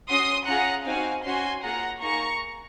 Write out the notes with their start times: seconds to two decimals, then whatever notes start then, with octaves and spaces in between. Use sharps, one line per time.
0.10 C#4 F#4 C6 D#6
0.47 C#4 F4 G#4 F#5 A#5
0.86 C4 D#4 F#4 F5 G#5
1.25 C#4 F#4 G#5 C6
1.63 A#3 F4 G#4 F#5 A#5
2.01 A#3 D#4 G#4 A#5 C#6